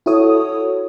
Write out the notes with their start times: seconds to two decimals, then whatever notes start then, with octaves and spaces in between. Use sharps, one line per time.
0.06 E4 F#4 A4 C#5 D#6